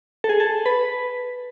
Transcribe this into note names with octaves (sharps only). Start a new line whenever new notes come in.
A4
G#4
A4
B4